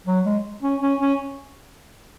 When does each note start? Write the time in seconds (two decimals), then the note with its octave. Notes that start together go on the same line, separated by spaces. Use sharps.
0.06 F#3
0.25 G#3
0.63 C#4
0.81 C#4
1.01 C#4